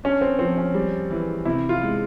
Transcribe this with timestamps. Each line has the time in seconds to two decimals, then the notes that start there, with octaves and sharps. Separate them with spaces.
0.04 C#4 D4
0.21 C4
0.39 F3 C4
0.58 C#4
0.74 G3
1.11 E3
1.45 C3 E4
1.69 F4
1.82 G#3